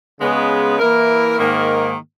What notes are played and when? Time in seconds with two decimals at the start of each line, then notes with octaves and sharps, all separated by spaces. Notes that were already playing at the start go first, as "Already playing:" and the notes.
0.21 C#3 G#3 B3
0.79 E3 A#3 E4 A#4
1.39 G#2 D#3 A#3